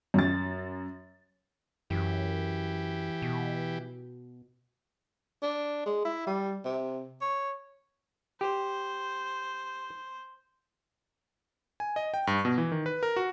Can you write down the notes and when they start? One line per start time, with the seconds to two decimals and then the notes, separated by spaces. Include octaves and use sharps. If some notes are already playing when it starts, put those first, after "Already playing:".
0.14 F#2 A6
1.90 F#2 E3 G4
3.22 B2
5.43 D4
5.86 G#3
6.05 E4
6.27 G3
6.65 C3
7.21 C#5
8.41 G4 C5
11.80 G#5
11.96 D#5
12.14 G5
12.27 G2
12.45 B2
12.58 E3
12.72 D#3
12.86 B4
13.03 A#4
13.16 F#4